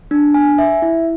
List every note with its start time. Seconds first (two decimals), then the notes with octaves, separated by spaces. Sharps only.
0.11 D4
0.34 G#5
0.58 E5
0.82 E4